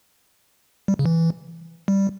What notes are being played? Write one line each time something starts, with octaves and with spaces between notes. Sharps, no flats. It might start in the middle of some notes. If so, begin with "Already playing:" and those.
G3
C#3
E3
G3